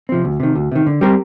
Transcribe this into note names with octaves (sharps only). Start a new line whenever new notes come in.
C3 F3 C4
D2
C3 D#3
D2
C3 D#3
D3
G3 C4 G4 A#4